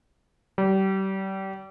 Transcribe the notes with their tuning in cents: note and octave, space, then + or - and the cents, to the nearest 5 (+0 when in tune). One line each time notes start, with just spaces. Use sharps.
G3 -30